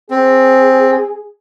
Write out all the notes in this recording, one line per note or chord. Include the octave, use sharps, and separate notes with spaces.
C4 G#4